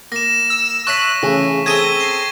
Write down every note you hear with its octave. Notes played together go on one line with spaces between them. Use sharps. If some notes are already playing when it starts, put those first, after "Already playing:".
A#3 A#6 E7
E6
C#5 E5 A5 C#6 F#6 B6
C#3 E3 A3
C4 G#4 A4 G#6 A#6 D#7 G7
C7